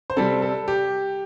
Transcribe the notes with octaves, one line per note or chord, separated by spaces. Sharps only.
C5
C3 G3 C4 A4
A4
G4